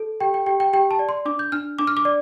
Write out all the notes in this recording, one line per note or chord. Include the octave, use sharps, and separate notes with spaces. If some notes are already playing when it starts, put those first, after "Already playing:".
Already playing: A4
G4 G5
G5
G4 G5
G5
G4 G5
A5
D5
C6
D4 D6
G6
D4 F6
D4 D6
F6
D6
D5